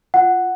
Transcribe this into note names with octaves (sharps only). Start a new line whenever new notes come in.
F4 F#5